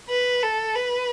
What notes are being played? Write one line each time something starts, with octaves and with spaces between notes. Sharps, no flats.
B4
A4
B4